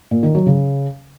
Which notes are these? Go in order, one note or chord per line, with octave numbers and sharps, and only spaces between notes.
A#2
D#3
F#3
C#3